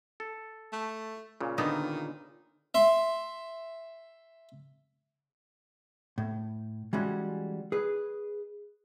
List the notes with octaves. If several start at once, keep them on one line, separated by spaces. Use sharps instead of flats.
A4
A3
A#2 C#3
D3 D#3 B3 D#4
E5 C6
A2
E3 G3 G#3 C#4 F#4
G#4 B4